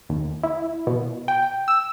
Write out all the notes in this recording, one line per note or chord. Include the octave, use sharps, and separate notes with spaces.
D#2
E4
B2
G5
E6